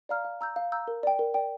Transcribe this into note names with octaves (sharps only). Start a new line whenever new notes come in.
D5 F5 A#5 F6
F5
A#5 E6 G6
F5
A#5 E6 G6
A#4
D5 G5
A#4
D5 G5